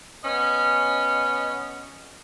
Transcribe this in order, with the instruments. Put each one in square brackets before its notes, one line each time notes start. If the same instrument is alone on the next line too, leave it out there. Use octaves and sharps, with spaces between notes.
[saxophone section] B3 C#4 D#5